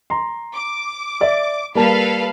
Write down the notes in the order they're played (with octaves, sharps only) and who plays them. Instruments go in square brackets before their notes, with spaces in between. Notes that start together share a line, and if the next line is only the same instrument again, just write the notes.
[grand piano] A#5 C6
[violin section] D6
[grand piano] D5 E5
[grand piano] G3 A#3 A5 [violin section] A4 B4 F5